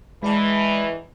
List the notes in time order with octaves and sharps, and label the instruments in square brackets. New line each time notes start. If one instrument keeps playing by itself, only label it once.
[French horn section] E2 D#3 E3 [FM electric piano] G#3 D5 A5 [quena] B5